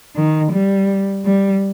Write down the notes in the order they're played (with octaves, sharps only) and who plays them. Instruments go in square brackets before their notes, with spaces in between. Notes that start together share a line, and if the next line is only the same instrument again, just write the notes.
[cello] D#3
G3
G3